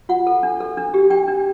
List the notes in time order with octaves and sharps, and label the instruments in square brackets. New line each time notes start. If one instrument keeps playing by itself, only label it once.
[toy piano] F4 F#5
A4
D4
A4
D4
G4
D4 G5
D4